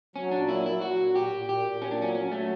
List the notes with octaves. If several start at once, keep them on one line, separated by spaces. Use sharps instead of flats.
F#3 C#4
A#2 D4
F#3 E4
F#3 E4
F#3 F#4
A#2
A#2 G4
A#2
A#2 G4
A#2
A#2 C#4
D4
F#3 C#4
F#3 C#4
F#3 A3